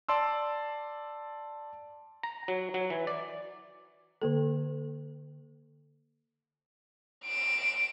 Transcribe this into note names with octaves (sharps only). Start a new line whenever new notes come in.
D5 A5 C6 E6
A#5
F#3
F#3
E3
D5
D3 A#3 A4
D7 E7